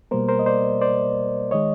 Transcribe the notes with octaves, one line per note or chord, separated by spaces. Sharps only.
B2 G3 A#3 A#4 C5
A#4 C5
D#5
C5 D5
C5 D5
D#3 G#3 C#5 D#5